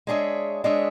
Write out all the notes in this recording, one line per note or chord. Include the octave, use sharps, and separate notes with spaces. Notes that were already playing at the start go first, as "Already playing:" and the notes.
G#3 D4 G#4 C#5 E5
G#3 D4 G#4 C#5 E5